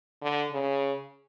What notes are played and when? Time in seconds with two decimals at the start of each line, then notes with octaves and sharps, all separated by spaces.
0.22 D3
0.51 C#3